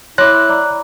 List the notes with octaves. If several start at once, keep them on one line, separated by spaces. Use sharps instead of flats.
E4 C#5 C6 D6 F#6
D5 A#5 D6